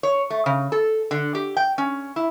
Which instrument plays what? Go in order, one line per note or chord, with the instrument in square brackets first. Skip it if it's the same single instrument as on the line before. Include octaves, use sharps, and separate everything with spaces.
[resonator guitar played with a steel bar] C#5
A3
C#3
A4
D3
G4
G5
C#4
E4